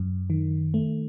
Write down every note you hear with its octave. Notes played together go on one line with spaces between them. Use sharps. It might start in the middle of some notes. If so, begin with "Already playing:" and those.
Already playing: F#2
D#3
A3